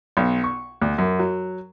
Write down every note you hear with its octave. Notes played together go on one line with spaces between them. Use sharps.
B1
C#6
D2
F#2
F#3